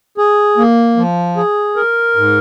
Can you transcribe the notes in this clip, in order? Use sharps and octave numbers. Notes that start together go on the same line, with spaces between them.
G#4
A#3
F3
G#4
A#4
G#2